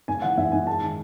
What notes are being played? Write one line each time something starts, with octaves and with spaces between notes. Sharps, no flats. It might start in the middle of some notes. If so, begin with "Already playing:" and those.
G#2 G#5
E3 F#5
G#2 E5
G#2 G#5
G#3 A5
D#3